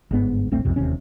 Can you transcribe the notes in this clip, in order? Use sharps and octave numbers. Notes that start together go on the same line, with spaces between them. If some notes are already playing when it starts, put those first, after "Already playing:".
G1 G#2 B3
D#1 A1 A3 C4
B1 F2 C3
E1 D#2 C3 C#4